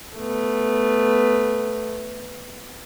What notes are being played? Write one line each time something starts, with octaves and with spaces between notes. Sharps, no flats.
A3 B3